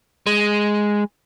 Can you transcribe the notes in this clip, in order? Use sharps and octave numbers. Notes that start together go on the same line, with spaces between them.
G#3